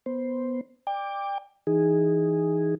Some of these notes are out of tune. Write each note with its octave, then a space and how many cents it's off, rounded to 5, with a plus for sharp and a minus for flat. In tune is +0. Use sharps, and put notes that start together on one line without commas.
B3 -5 C5 +0
D5 +15 G5 +30 D6 +0
E3 +0 D#4 +0 G#4 -10